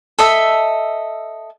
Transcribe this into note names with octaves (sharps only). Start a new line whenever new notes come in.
A4 D#5 E5